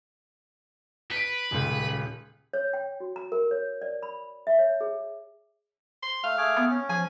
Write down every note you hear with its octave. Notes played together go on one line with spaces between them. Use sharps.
B4 B6 D7
D#1 C#2
C#5
G5
F#4
A#5
A#4
C#5
D5
B5
E5
C#5
G#4
C6
A3 F5
A3 G#4 D6
B3
C#4
F3 G#5